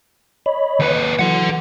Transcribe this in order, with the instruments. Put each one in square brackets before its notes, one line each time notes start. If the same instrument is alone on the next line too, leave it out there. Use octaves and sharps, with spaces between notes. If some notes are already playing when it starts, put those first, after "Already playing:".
[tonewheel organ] C#5 D#5 B5
[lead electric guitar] D#2 B4
[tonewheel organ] E3 F#3 [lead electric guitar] A4 F#5